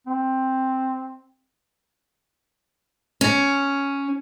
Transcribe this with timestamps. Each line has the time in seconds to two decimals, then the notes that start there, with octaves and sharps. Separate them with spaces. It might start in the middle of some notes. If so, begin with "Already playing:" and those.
0.07 C4
3.21 C#4